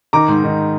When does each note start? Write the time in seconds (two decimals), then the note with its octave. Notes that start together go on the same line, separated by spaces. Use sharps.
0.13 D#3 A#5 D6
0.28 G#2
0.44 D#3